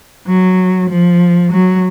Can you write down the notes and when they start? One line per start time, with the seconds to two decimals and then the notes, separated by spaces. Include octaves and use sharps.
0.27 F#3
0.90 F3
1.52 F#3